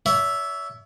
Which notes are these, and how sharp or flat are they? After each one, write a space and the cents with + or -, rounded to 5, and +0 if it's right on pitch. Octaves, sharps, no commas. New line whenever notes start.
C#5 +40 E5 +0